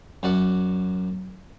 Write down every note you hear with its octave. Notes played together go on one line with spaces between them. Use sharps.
F#2 F#4 D5 F#5